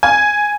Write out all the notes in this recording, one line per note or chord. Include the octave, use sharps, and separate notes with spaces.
G#5